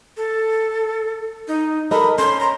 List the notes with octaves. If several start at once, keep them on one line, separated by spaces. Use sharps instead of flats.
A4
D#4
A4 A#4 D#5 B5
C#4 C6
A#5